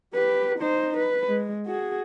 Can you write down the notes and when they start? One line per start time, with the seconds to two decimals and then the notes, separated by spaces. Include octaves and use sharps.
0.14 G4 B4
0.59 D#4 C5
0.97 B4
1.29 G#3
1.66 F#4 G#4